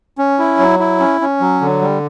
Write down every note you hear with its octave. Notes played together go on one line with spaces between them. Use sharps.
C#4
E4
F#3
E4
C#4
C#4
F#3
D3
G3